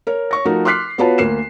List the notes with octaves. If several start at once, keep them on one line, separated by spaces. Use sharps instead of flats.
A#4 C#5
C#5 C#6 A#6
F3 A3 D#4 F#4 A4 A#4
C6 D6 F6 F#6 B6 C7
B3 F4 F#4 B4 C#5 A5
D2 A#3 C7 E7